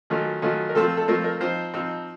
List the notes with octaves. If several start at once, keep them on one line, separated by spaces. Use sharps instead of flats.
D#3 F#3 A3 C#4 F4
D#3 F#3 A3 C#4 F4
A#4
F3 A3 C4 F4 A4
A4
F3 A3 C4 F4 A#4
A#4
F3 C4 D#4 C5
F3 C4 D#4